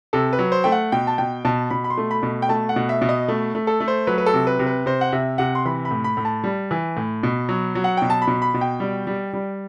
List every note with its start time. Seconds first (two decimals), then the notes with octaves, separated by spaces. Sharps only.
0.13 C3 A4
0.33 B4
0.39 F#3
0.52 C5
0.64 A3 G5
0.72 F#5
0.92 B2 G5
1.07 A5
1.18 B2 G5
1.45 B2 A5
1.70 B2 B5
1.84 B5
1.90 C6
1.98 A3
2.11 B5
2.23 B2
2.42 G5
2.49 A3 A5
2.69 F#5
2.76 B2
2.89 E5
3.02 B2
3.09 D#5
3.28 A3
3.55 A3
3.67 A4
3.80 A3
3.88 C5
4.07 F#3 B4
4.18 B4
4.26 A4
4.34 C3
4.47 B4
4.59 C3
4.67 B4
4.86 C3 C5
5.01 F#5
5.12 C3 E5
5.38 C3 F#5
5.55 C6
5.65 E3 B5
5.85 B5
5.91 A2
6.04 B5
6.17 A2
6.25 A5
6.44 G3
6.71 E3
6.97 A2
7.23 B2
7.49 F#3
7.75 F#3
7.84 F#5
7.97 B2 G5
8.10 A5
8.22 B5
8.28 B2
8.42 B5
8.54 B2
8.61 G5
8.80 G3
9.07 G3
9.33 G3